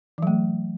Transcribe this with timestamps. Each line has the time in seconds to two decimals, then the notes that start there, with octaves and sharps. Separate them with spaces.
0.18 E3
0.22 F#3
0.27 A3